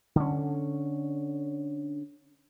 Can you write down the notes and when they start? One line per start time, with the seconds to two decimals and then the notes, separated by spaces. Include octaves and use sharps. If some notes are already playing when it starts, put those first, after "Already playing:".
0.16 D3 C#4